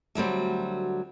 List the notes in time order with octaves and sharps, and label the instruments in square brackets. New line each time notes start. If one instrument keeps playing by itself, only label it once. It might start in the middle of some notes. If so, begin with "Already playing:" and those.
[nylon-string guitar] D2 F#3 G3 C4